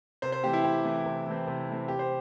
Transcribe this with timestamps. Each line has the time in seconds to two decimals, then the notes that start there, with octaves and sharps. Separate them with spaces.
0.22 C3 C5
0.32 C5
0.43 E3 A3 C4 G4
0.53 E4
0.64 C3 G4
0.85 E3 A3 C4
1.06 C3
1.26 E3 A3 C4
1.47 C3
1.68 E3 A3 C4
1.88 C3 G4
1.99 C5